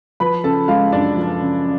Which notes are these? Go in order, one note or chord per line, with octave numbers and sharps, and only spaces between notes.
F3 B4 B5
C#3 A4 A5
G#3 F4 F5
F#2 D4 D5
F3
C#3